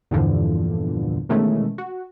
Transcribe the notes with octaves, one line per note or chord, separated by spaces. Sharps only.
E2 G2 A#2 D3 E3 F3
B2 D#3 E3 G#3 A3 C#4
F#4